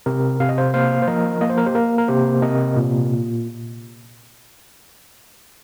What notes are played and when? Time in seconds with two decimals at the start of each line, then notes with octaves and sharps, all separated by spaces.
0.06 C3 A#4
0.40 C3 F5
0.49 D#5
0.58 C5 F5
0.74 A#3 C5 F5
1.02 C5
1.07 F3 A#4 D#5
1.41 A#3 D#5
1.50 C5
1.58 A#4
1.66 G4 C5
1.75 A#3 A#4
1.98 A#4
2.08 C3 G4 C5
2.42 C3 A#4 D#5
2.76 A#2